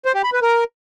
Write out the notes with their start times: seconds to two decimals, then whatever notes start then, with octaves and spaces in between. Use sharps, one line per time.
0.05 C5
0.14 G4
0.24 B5
0.33 B4
0.42 A#4